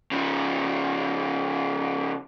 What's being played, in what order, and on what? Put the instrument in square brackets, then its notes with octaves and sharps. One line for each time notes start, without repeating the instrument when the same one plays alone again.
[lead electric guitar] C#3 F3